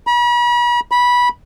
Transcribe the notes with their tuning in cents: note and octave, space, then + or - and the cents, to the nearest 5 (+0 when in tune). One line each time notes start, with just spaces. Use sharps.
B5 -40
B5 -15